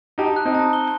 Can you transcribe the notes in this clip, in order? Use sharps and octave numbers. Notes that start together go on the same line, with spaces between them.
D#4 G4 A5
F#6
C4 D#4
A5
G7